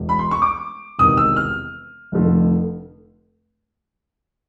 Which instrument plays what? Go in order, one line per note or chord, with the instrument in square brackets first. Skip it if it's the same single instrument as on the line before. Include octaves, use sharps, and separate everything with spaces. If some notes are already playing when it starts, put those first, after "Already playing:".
Already playing: [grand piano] E1
B5
C6
C#6
D6
E1 E2 C3 D#3 D#6
E6
F6
F1 F2 D3 F3 A3